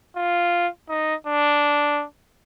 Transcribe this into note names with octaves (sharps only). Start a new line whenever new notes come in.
F4
D#4
D4